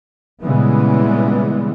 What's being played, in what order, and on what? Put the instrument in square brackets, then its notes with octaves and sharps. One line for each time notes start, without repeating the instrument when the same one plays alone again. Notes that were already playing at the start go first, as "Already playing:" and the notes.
[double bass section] A#2 C#3 E3 G3 G#3 B3